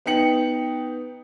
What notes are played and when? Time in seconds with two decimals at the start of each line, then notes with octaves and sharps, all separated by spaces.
0.06 B3 D#4 G5 C#7 F#7